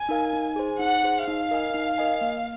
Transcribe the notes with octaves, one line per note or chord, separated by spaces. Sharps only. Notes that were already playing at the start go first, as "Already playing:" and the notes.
Already playing: G#5
D#4 A#4 F5
D#4
G#4 C5
D#4 F#5
G#4 C5
D#4 F5
A#4 D#5 G#5
D#4
A#4 D#5 G#5
A#3